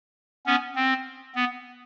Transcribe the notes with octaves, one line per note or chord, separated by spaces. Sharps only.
B3 C#4
C4
B3